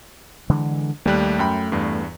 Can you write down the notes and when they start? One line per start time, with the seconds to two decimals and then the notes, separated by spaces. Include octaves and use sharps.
0.50 D3 E3 G#3
1.06 D#2 G3 A3 F#6
1.39 F#2 G5 B5
1.72 E2 G2